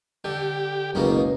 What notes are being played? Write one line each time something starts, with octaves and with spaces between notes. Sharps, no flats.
D3 G4
F#1 C#2 B2 A#3